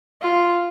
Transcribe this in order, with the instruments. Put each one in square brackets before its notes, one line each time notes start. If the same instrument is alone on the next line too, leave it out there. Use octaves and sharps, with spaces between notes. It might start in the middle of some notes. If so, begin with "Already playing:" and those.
[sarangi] F4